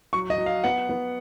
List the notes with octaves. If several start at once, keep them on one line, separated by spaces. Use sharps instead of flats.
F#3 C#6
D#5
F#3
F5
B3 F#5
B3